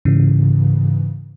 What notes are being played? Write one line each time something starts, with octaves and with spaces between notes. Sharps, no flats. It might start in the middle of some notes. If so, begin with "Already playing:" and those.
G#2 C#3 E3